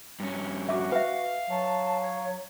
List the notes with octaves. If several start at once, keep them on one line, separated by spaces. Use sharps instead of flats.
G2 C#4
F#4 E5 D6
B4 E5 F5
F#3 A5
C#5